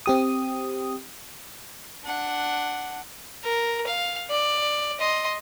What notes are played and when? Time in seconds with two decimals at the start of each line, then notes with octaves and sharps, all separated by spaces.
0.06 C4 G4 D#6
2.04 D4 F#5
3.43 A#4
3.86 F5
4.30 D5
4.99 D#5 C6